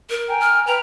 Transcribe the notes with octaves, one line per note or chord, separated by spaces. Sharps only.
A#4
G5 G#5 A#5
F6
B4 G5 A#5 F6